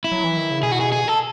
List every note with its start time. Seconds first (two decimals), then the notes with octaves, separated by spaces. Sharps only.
0.04 E4
0.12 F#3
0.24 E3
0.37 D#3
0.51 C#3
0.63 B2 G#4
0.72 F#4
0.80 G#4
0.92 G#4
1.08 A4